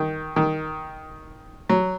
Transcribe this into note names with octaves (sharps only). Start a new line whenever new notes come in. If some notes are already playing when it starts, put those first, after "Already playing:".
Already playing: D#3
D#3
F#3